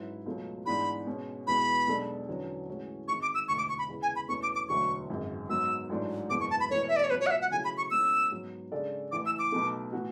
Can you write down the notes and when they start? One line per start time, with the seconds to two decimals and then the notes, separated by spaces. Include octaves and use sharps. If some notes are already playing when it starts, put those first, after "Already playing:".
Already playing: G#2 F#3 C#4 E4 B4
0.26 C#2 B2 F#3 A3
0.66 G#2 E3 B3 D4 G#4 B5
1.07 B2 G#3 C#4
1.47 E2 B2 G#3 B3 B5
1.87 B1 B2 G#3 D4 A4
2.28 E2 D3 F#3 C#4
2.68 A2 E3 G#3 C#4 F#4
3.08 G#1 G#2 G#3 C#6
3.22 D6
3.34 E6
3.48 E1 D2 D3 C#6
3.58 D6
3.69 C#6
3.79 B5
3.89 E2 C#3 G#3
4.03 G#5
4.16 B5
4.28 E2 B2 A3 C#4 C#6
4.43 D6
4.55 D6
4.69 E1 D2 D3 F#3 C#6
5.09 G#1 F#2 C#3 G#3
5.49 G#2 F#3 B3 E6
5.89 A1 G#2 F#3 A3 D4
6.30 F#1 E2 B2 G#3 D6
6.40 C#6
6.51 A5
6.60 B5
6.70 E1 E2 B2 A3 C#5
6.89 E5
6.96 D5
7.04 C#5
7.10 C#2 B2 F#3 B4
7.20 C#5
7.27 F#5
7.31 E5
7.42 F#5
7.50 C#3 F#3 A3 E4 G#5
7.65 B5
7.77 C#6
7.91 B2 G#3 C#4 E4 E6
8.31 G#2 F#3 B3
8.72 C#3 G#3 D4 A4 D5
9.12 A1 A2 E3 D6
9.26 E6
9.39 D6
9.52 B1 B2 A3
9.92 A2 E3 B3 F#4